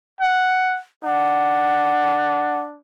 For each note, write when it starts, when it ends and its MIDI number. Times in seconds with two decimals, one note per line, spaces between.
0.21 0.78 78
1.03 2.77 62
1.03 2.58 78